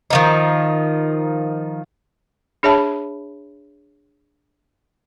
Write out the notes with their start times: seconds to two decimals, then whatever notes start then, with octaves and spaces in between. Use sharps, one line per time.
0.10 D#3 F3 D#4
2.63 D4 G#4 C#5 E5 A5 B5